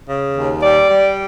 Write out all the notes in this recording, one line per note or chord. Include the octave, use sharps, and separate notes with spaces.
C#3
D#2
G3 D5
G3